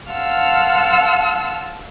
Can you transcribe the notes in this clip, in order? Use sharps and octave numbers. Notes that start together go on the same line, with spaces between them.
F5 F#5 A5 C6 E6 F6